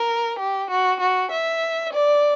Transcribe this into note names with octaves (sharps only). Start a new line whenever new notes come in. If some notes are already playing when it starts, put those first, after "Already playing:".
Already playing: A#4
G4
F#4
F#4
E5
D5